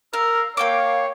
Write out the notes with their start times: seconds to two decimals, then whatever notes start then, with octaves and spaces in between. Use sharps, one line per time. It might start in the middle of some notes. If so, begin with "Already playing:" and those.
0.13 A#4 F5 E6
0.57 A#3 C#5 F5 G5 D6